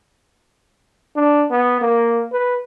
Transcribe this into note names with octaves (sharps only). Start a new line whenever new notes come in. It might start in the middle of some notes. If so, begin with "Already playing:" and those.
D4
B3
A#3
B4